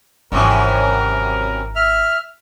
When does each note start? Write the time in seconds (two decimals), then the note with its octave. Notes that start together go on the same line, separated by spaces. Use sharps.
0.32 G#1 F#2 C3 E3 A#4
1.76 E5 F6